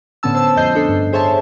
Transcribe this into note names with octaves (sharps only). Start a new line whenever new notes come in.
A2 D3 B3 C#4 A5 E6
C5 A5 E6
F2 A2 D#5 G6 C7
D4 A4
G2
G#4 C5 C#5 E5 A5